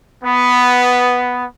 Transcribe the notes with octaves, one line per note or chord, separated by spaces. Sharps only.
B3